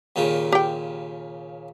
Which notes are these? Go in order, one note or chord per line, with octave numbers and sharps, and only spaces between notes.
D#2 A#2 C#3
G4 G5